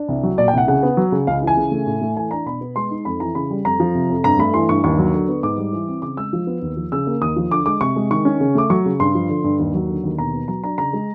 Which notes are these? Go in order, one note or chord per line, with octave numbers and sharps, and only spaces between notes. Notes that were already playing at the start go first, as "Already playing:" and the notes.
Already playing: D4
C2
F#3
A#2 D5
G5
C2 F#5
C#3 F#5
B3
F#3
C#3
C#2 F5
E3
G#5
C#3
A3
A2
A3
E3 G#5
D4 A#5
B2 B5
B3
G#3 C6
D#4
F2 B5
E3 A#5
C#3 B5
G3
F2 A#5
F3
C3
F2
G2 A#5
A3 B5
E3 C6
G2 C#6
D#2 C#6
F#3
D3
B3
G#2 D6
G3
E3
C4
C#3 D6
G#3 E6
F3
B3
D#2
F3
C#3 E6
A#3
D#2 D#6
F3
D3 D6
G#3 D6
C3 C#6
G#3
D#3 C#6
C#4
C#3
A3 D6
F#3 C#6
C#3
G2 C6
F3
D3
G2
D#2
F#3
D3
D#2
B2 A#5
B3
F#3 A#5
D4 A#5
C#3 A#5
G#3